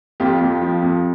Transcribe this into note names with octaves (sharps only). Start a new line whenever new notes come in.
F2 F4 G4
F2
F3
F2